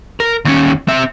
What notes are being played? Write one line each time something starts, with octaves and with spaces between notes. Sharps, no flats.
A#4
D#2 C#4
C4 E5